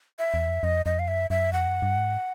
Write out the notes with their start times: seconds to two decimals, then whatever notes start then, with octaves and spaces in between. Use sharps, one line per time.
0.19 E5
0.34 E2
0.48 F2
0.63 F2 D#5
0.86 F2 D#5
0.99 F5
1.08 F#2 E5
1.30 F#2 E5
1.53 F2 F#5
1.68 F#2
1.82 G2
1.97 G#2